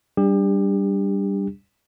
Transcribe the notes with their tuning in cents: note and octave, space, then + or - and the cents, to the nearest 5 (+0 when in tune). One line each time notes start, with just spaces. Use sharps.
G3 +0 D4 +0 G4 +35